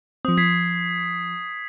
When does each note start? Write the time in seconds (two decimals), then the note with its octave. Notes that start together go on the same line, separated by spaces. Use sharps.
0.25 F3 C4 D#6
0.37 F3 G#6 B6 C7